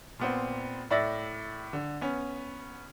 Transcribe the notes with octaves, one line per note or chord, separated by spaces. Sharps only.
A#2 B3 C4
A2 D5 E5 A#6
D3
B3 C#4